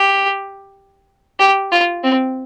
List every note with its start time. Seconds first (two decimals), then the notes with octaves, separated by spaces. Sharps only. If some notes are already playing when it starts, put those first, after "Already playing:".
Already playing: G4
1.39 G4
1.72 F4
2.03 C4